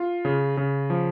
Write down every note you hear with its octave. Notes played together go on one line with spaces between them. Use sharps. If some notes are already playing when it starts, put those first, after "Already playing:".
Already playing: F4
C#3
C#3
F3